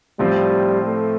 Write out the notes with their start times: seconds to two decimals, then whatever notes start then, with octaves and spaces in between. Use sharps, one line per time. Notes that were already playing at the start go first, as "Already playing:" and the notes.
0.19 A2 F3 G3 C4 F4
0.87 A3